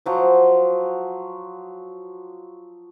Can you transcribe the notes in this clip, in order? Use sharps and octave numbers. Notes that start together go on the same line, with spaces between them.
F3 F#3 C5